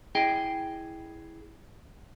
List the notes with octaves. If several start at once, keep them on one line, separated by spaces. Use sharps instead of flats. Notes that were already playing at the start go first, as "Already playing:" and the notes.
E4 G#4 D#5 G5